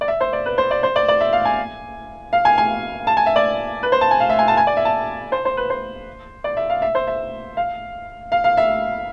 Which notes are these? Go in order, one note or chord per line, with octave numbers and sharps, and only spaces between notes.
D5
E5
C5
D5
B4
C5
D5
C5
D5
D5
E5
F5
G#5
F5
G#5
G#5
A5
G#5
E5
D5
B4
C5
A5
G#5
F5
E5
G#5
A5
G#5
D5
E5
A5
C5
C5
B4
C5
D5
E5
F5
E5
C5
E5
F5
F5
F5
E5